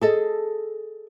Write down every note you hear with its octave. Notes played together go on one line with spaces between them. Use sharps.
G#4 A4 D#5